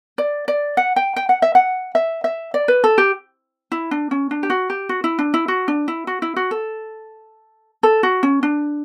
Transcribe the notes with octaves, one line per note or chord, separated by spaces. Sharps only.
D5
D5
F#5
G5
G5
F#5
E5
F#5
E5
E5
D5
B4
A4
G4
E4
D4
C#4
D4
G4
F#4
G4
F#4
E4
D4
E4
F#4
D4
E4
F#4
E4
F#4
A4
A4
F#4
C#4
D4